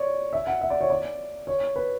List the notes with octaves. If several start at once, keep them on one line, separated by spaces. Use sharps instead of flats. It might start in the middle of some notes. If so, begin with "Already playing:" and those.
Already playing: C#5 D5
E5
F#5
E5
D5
C#5
D5
C#5
B4